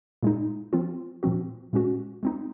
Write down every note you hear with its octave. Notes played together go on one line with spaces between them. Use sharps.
A#2 G#3 D#4
F3 C4 F4
A#2 F3 C4 F#4
A#2 G#3 C#4 F#4
G#3 C4 D#4